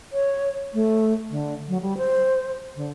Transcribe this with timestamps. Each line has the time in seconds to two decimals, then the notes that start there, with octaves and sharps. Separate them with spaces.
0.13 C#5
0.74 A3
1.30 D3
1.68 F#3
1.82 G3
1.98 C5
2.76 D3